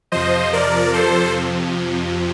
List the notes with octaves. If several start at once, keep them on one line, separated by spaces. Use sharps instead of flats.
F2 C3 F3 C5 D#5
A#4 D5
A4 C5